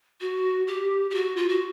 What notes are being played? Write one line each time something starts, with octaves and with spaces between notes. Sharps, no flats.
F#4
G4
G4
F#4
F4
F#4